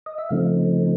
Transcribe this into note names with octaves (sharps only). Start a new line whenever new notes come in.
D#5
E5
C#3 F3 A3 C4 D#4 F5